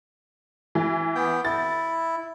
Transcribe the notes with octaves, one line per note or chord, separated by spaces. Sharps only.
E3
B3 G5
E4 A6